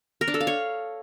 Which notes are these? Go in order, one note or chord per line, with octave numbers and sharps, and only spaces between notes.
A#4
D4
A4
F5
C#5